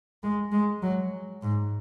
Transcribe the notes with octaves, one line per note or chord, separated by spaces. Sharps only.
G#3
G#3
F#3
G#2